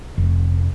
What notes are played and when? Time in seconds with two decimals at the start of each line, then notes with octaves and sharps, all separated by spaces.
0.18 F1